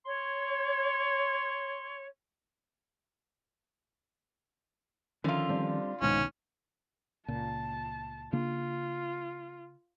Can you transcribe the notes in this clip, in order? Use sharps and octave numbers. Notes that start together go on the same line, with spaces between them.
C#5 C6
D3 D#3 F3 C#4 F4
G3 C4 D4
C2 G#2 B2 D#3 C#4
C#2 A#2 A5
C#3 A#3 D4 F4